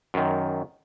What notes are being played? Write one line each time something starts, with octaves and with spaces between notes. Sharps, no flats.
F#2 D#3